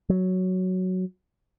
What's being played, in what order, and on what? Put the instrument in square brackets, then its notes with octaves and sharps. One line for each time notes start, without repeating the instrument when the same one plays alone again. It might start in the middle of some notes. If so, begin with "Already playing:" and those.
[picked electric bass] F#3